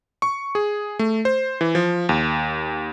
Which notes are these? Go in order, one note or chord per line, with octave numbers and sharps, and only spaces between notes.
C#6
G#4
A3
C5
E3
F3
D#2